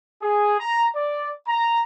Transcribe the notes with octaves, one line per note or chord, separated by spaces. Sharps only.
G#4
A#5
D5
A#5